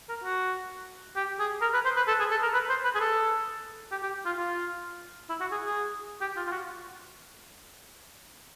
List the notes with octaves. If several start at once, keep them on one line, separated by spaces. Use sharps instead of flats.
A#4
F#4
G4
G#4
A#4
B4
C5
B4
A4
G#4
A4
A#4
B4
C5
B4
G#4
A4
G4
G4
F4
F4
E4
F#4
G#4
G#4
G4
F4
F4
F#4